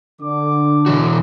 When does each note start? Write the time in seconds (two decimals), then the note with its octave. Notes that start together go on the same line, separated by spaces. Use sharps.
0.21 D3 D6
0.86 B2 E3 F#4